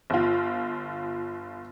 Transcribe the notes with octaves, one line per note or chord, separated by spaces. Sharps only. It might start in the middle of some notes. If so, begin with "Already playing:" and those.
G1 F4